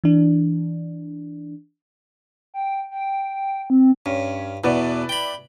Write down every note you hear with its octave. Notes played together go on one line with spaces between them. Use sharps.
E3 D4
G5
G5
C4
G2 C#4
E2 B2 E4 B4 D5
G5 B5